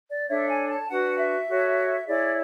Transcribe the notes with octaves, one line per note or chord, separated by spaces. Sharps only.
D5
D4 A4 C#5 E5
G#5
A5
D4 F#4 B4 F#5
E5
F#4 A4 C#5
E4 G#4 C#5 D5